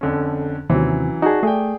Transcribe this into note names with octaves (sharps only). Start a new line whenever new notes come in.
F2 D3 C#4
D#2 C3 E3 F#3 C4 C#4
D#4 F#4 G#4 D5 A5
A3 G#4 D5 G5